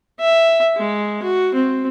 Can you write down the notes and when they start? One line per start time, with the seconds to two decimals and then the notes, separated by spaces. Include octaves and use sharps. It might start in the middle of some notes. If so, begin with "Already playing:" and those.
0.20 E5
0.76 G#3
1.23 F#4
1.54 C4